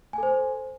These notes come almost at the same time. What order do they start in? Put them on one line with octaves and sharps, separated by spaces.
G#5 A4 C5